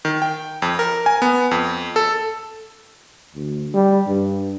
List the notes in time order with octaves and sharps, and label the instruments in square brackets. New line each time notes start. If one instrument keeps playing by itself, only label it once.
[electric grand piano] D#3
G5
F2
A#4
G#5
B3
F2
A4
[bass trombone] D2
G3
G2